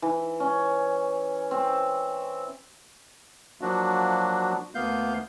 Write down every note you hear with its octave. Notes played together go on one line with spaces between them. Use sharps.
E3
C#4
C4
F3 F#3 A#3 D4 F#4
D2 A#3 B3 F5 G6